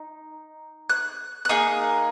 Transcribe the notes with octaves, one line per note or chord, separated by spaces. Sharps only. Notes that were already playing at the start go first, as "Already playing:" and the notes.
Already playing: D#4
F#6
F#6
A#3 D#4 G#4 D#6